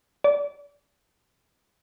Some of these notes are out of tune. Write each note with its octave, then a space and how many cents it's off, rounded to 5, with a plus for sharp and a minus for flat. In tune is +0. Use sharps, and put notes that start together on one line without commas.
D5 -20